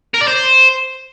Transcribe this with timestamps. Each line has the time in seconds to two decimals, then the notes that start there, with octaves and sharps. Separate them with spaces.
0.14 A#4
0.21 D5
0.28 C5